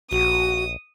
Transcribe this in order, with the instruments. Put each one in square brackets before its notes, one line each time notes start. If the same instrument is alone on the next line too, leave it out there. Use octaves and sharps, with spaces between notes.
[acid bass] A#1 [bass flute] F#4 [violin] D#6